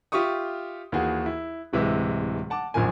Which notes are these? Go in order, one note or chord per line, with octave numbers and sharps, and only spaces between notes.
F4 G4 E5 C#6 D#6
D#2 E3 F#4 G#4
E4
D1 C3 E3 G#3 E5
F#5 A5 D6
A#1 F#2 A#2 D#3 G#5